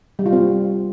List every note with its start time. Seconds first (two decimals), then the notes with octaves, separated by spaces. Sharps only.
0.19 G3
0.26 F4
0.33 C4